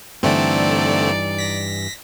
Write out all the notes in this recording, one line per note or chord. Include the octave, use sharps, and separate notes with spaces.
G2 D3 E3 A3 C4 D#4 D5
A#6 B6